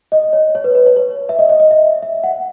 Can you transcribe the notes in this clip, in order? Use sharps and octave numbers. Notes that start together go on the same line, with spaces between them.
D#5
C#5
C#5
B4
B4
C#5
C#5
E5
D#5
D#5
D#5
E5
E5
F#5